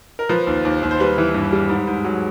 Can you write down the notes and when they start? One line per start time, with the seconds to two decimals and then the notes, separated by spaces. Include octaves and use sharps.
0.19 A#4
0.29 F3 B4
0.47 D#2
0.65 D#2
0.83 D#2
0.91 C5
1.00 G3 B4
1.18 E3
1.34 G2
1.52 G3
1.69 G#2
1.87 G#2
2.04 F#3